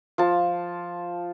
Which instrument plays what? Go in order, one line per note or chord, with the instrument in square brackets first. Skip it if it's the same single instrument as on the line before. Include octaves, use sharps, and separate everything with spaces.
[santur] F3 A5